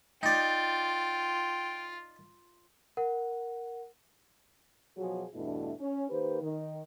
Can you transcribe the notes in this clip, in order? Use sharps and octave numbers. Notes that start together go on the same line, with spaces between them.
D#4 F4 D5 G5
A#4 F#5
B2 F3 F#3 F#4 G#4
E2 G2 B2 A3 D4 E4
C#4
D#3 A#3 G4 B4 C5
D#3